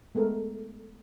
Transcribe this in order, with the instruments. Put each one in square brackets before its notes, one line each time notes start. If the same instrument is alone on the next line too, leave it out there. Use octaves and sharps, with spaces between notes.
[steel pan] G#3 A3 B3 A4 A#4